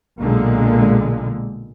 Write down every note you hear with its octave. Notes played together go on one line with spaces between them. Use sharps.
B1 A#2 D3 G#3 A#3